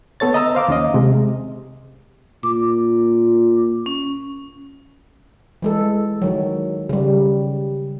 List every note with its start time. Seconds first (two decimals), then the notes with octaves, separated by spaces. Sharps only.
0.20 B3 A4 C#5 A6
0.34 D#5 A#5 E6
0.55 C5 F5 D6
0.68 D#2 C#4 D#5
0.94 C3 G#3
2.43 A#2 D6
3.86 C#4
5.62 E3 G#3 A4
6.22 D#3 F#3
6.89 C#3 G3